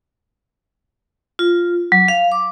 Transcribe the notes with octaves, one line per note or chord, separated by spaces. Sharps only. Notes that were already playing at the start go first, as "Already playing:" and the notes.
F4
F#3
F5
D6